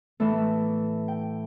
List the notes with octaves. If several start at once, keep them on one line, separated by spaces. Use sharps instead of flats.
A2 E3 A3
G5